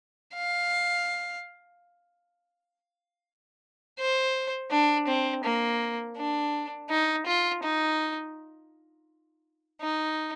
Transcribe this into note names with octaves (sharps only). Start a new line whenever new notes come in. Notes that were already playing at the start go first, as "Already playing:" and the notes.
F5
C5
D4
C4
A#3
D4
D#4
F4
D#4
D#4